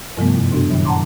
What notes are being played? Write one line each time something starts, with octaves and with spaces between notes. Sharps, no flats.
G2 C3 F3 G3 A3 B3
F#2
B2 D4 F#4
F#2 A#2 D#3 F#3
F#5 A5 A#5 C6 D6